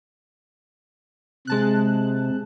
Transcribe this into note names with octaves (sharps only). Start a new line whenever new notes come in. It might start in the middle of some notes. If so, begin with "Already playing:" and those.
C3 G#3 A5 F#6